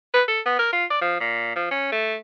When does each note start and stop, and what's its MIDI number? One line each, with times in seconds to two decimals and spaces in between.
0.14 0.23 71
0.28 0.40 69
0.46 0.57 59
0.59 0.73 70
0.73 0.85 65
0.90 1.01 74
1.02 1.16 53
1.20 1.54 46
1.56 1.69 53
1.71 1.88 61
1.92 2.16 57